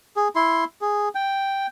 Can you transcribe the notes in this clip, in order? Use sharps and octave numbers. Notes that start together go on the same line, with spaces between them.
G#4
E4 C6
G#4
G5